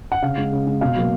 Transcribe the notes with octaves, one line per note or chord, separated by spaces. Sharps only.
F#5
C#3 F5
G#3
C#3
G#3
B2 F5
F#3 A#3